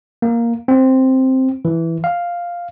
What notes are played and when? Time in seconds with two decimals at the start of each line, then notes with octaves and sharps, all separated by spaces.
0.22 A#3
0.68 C4
1.65 E3
2.04 F5